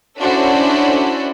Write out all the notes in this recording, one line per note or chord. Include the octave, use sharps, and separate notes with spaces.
C#4 D4 E4 F#4 A4 C5